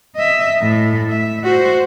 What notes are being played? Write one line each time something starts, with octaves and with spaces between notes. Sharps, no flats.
D#5 E5
A2
E5
F#4 C5